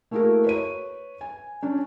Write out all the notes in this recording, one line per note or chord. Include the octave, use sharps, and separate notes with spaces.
A3 A#3 E4 F#4 G#4 A#4
B4 C#5 D#7
G#5
C#4 D4